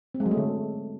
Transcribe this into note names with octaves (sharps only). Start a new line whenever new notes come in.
C4
G#3
F#3
A3
D3